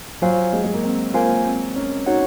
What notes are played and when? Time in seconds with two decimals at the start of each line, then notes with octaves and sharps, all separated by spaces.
0.22 F#3 F4 C5 F5 G#5
0.53 G#3
0.64 G#3
0.74 A#3
0.84 C4
1.14 A#3 F4 C5 F5 G#5
1.45 C4
1.76 C#4
2.06 D#4 F#4 C#5 F#5